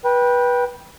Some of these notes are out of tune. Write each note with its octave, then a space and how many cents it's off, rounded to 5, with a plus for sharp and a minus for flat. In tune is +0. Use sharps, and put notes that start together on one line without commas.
B4 -20 G5 +0